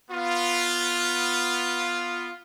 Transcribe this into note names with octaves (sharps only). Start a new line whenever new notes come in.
B3 F4